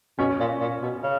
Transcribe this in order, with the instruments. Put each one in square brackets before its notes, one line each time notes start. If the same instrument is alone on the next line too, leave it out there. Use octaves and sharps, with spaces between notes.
[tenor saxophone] B2 [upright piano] C#4
[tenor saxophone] A#2
A#2
B2
C#3